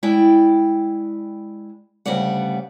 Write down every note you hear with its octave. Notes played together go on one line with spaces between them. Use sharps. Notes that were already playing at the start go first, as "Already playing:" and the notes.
G#3 E4 D5 G5
D2 C#3 G3 B3 D5 F#5